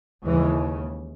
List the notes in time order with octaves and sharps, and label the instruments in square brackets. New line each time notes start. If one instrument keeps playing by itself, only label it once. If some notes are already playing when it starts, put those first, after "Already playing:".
[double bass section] D#2 C#3 E3 G#3